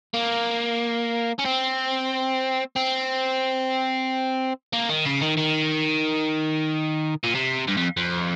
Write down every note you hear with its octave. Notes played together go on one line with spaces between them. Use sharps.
A#3
C#4
C4
C4
A#3
D#3
C#3
D#3
D#3
A#2
C3
G2
F2
F2